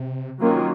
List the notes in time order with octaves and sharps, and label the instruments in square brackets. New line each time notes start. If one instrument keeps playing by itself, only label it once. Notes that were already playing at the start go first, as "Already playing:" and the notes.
Already playing: [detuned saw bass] C3
[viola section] D#3 F#3 A#3 C#4 F4